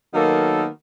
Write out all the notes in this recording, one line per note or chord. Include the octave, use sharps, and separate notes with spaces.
D#3 F#3 A#3 B3 A4